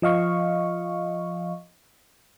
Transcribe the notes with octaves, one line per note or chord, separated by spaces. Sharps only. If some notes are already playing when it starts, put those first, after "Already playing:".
F3 D#5 F5 C#6